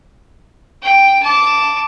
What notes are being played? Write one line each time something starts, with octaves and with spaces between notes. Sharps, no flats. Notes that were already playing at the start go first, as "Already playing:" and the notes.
G5
A5 D6